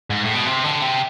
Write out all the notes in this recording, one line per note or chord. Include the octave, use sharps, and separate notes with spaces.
G#2
A2
B2
C3
D3
C3